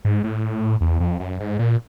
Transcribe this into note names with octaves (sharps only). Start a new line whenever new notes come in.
G#2
A2
E2
F2
F#2
G#2
A#2